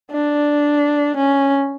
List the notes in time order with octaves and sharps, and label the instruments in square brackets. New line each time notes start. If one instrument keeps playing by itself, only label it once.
[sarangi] D4
C#4